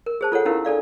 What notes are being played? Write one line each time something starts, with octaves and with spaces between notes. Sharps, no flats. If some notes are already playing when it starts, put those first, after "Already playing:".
A#4
G#4 C5 A5
F4 A4 C#5 F#5
C#4 D#4 E4 G4 A#4 F5
D4 A4 D5 F5